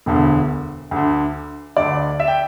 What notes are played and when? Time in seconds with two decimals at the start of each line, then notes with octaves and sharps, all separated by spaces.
0.06 E1 D2 D3
0.91 D2 D3
1.76 D2 D3 D5
2.20 E5
2.28 G5